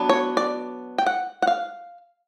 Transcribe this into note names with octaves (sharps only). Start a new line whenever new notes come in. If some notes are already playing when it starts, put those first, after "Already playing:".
Already playing: F#3 B3 D4
C#5
D5
G5
F#5
F#5
F5